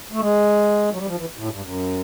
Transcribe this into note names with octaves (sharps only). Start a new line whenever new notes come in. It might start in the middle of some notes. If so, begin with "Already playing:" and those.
A3
G#3
F#3
G3
F3
E3
A2
G#2
G2
F#2